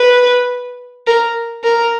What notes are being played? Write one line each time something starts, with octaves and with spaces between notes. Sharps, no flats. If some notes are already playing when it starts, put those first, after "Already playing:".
Already playing: B4
A#4
A#4